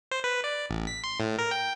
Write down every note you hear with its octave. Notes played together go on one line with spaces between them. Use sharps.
C5
B4
D5
A1
B6
C6
A2
A#4
G5